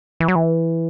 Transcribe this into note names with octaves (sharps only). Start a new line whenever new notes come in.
E3
F#3
E3